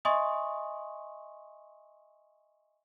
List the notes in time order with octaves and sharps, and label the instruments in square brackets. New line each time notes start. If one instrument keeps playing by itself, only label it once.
[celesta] D#5 E5 G#5 C6 C#6 D#6